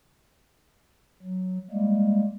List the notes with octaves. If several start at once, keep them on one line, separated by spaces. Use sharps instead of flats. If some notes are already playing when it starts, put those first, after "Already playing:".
F#3
G3 G#3 A#3